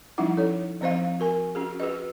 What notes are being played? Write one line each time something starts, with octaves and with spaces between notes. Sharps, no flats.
F3 G3 C#4 D#4 E4 F#5
A4 C#5
F3 C4 C5 D#5 F5
F#4 A#4 G#5
C#4 F#4 G#4
F#4 G#4 B4 D#5